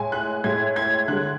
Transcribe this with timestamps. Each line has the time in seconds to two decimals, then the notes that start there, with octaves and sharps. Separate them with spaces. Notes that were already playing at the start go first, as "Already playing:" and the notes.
Already playing: A2 G#3 G#5
0.12 F#6
0.44 A2 G#3 G#6
0.76 G#6
1.08 D3 G#3 F#6